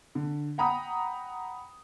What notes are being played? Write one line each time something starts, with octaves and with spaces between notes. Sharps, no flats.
D3
F#5 G5 A#5 B5 D#6